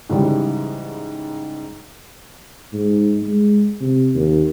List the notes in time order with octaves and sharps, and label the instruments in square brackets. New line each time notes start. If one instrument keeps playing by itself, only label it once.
[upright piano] G#2 C#3 E3 G3
[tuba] G#2
G#3
C3
D#2